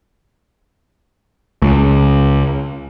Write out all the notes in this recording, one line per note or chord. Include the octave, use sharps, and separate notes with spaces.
C#2